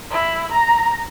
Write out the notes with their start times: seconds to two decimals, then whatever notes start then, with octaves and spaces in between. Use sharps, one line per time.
0.11 E4
0.52 A#5